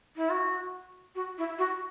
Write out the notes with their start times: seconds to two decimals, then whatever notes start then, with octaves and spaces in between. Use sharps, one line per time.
0.16 E4
0.29 F#4
1.15 F#4
1.38 E4
1.58 F#4